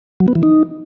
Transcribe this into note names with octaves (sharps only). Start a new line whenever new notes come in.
F#3
B3
E3
D#4